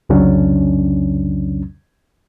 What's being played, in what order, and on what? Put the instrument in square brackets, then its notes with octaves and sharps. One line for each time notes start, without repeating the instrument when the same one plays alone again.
[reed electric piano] C2 F2 C#3 F#3 C#4 D4